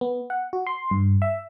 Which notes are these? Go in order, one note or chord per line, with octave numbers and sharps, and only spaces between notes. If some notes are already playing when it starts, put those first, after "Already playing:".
B3
F#5
F#4
C6
G2
E5